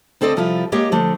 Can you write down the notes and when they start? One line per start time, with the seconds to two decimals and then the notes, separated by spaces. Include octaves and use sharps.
0.21 D2 C4 A4 D5 D#5
0.36 C3 F3 G3 E4 F4
0.72 G#3 A#3 G4 C#5 D#5
0.92 D3 F3 A3